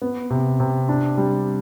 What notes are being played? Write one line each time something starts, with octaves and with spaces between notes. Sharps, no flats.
B3
C3
C3
D4
G3